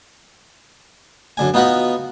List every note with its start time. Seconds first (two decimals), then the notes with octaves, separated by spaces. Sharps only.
1.37 F#2 D3 G#5
1.54 B3 D#4 F4 F#4 B4 F#5